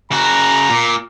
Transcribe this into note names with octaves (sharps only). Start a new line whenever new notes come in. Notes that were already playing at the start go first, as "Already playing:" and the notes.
C#3 F#4 A#5
A#2